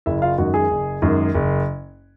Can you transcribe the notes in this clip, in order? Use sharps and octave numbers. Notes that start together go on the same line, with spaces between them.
F#1 E4 E5
F4 F5
F#2 D#3 G#3 F#4 F#5
G#4 G#5
F#1
F#2 D#3 G#3
F#1